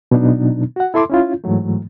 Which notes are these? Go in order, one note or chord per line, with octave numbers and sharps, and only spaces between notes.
B2 F#3 B3 D4 D#4
F#4 F#5
E4 A4 E5 C6 D6
C#4 E4 F4
G#2 E3 F#3 A3